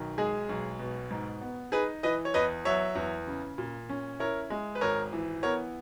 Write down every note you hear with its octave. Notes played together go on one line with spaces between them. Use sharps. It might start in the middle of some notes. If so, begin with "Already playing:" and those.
Already playing: B1 D#3
G#3 G#4
B1
B2
G#2
B3
D#4 G#4 B4
E3 B4 D#5
C#5
E2 B4 D#5
F#3 C#5 E5
E2
C#3
A#2
C#4
E4 A#4 C#5
G#3
B4
G#1 A#4 C#5
E3
B3 A#4 C#5